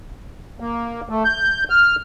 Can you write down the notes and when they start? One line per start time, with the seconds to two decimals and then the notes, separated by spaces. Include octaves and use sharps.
0.60 A#3
1.09 A3
1.25 G6
1.70 F6